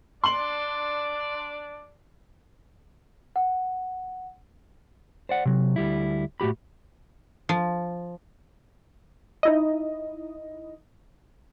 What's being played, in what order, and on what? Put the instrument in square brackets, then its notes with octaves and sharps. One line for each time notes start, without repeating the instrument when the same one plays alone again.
[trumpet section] D4 D5 [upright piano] C6 F#7
[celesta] F#5
[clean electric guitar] C5 D5 F#5
C3 F#3
D2 G3 E4
A2 F#4 G4 B5
[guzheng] F3
[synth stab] D#4 E4 D#5